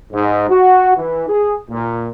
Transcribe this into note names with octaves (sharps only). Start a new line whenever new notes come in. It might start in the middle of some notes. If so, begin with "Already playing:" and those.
G#2
F#4
E3
G#4
A#2